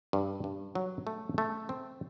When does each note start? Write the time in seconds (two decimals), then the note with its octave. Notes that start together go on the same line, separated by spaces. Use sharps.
0.13 G2
0.44 G2
0.75 F#3
1.07 A3
1.38 A3
1.69 C4